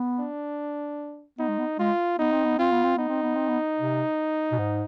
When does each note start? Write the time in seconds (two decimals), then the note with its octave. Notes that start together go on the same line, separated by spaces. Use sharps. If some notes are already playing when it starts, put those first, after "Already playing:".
Already playing: B3
0.19 D4
1.39 B3 D#4
1.48 G#3
1.58 B3
1.79 G#3 F4
2.18 B3 D#4
2.32 C4
2.44 B3
2.57 C4 F4
2.71 B3
2.84 C4
2.96 B3 D#4
3.09 C4
3.22 B3
3.35 C4
3.48 B3
3.79 C3
4.52 B2
4.58 G#2